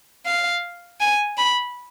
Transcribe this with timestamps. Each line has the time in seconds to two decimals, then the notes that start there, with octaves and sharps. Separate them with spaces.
0.26 F5
1.00 G#5
1.38 B5